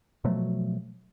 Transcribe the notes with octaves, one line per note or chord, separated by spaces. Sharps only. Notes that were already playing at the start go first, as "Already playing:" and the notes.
B2 F3 F#3 A3